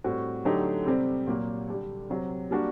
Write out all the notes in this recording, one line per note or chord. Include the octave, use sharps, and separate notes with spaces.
A2 G3 C4 F#4
D3 F#3 A3 D#4 G4
C3 G3 C4
A#2 F#3 A#3 F#4
D3 G3 D4 G4
C3 F#3 C4
G3 A#3 D4 F#4